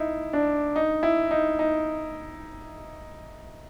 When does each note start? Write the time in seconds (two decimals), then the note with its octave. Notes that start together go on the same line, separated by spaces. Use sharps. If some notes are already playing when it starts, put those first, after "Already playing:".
Already playing: D#4 E4
0.33 D4
0.76 D#4
1.03 E4
1.31 D#4
1.59 D#4